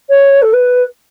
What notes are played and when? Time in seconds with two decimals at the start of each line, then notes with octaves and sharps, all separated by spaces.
0.09 C#5
0.41 A4
0.52 B4